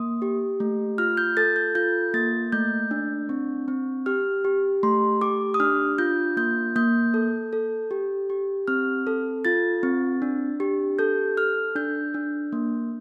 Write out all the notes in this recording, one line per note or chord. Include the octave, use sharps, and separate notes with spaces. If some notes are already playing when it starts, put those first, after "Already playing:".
Already playing: A#3 D#6
G4
A3
F4 F6
G6
A4 A6
G6
F4 G6
A#3 A6
A3 G6
D4
C4
C4
G4 F6
G4
A3 C6
G4 D6
D#6
D4 F6
F4 G6
A#3 G6
A#3 G6
A4
A4
G4
G4
C4 F6
A4
F4 A6
C4
D4
G4
A4 G6
A4 F6
D4 G6
D4
A#3